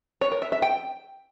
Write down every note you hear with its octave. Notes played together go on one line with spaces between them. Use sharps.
C#5
A#4
E5
E5
G5